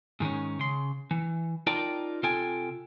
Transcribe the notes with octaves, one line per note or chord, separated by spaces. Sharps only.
G#2 D#3 G#3 C#4
C#3 C6
E3
D#4 F4 A#4 D5 G5 A5
C3 F4 A4 G5 G#5